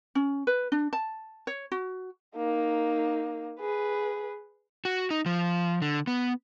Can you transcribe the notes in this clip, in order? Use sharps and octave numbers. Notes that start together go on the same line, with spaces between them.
C#4
B4
D4
A5
C#5
F#4
A#3 D#4
G#4 B4
F#4
D#4
F3
D3
B3